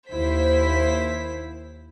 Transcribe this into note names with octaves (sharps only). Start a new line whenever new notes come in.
D#2 E4 C5 B6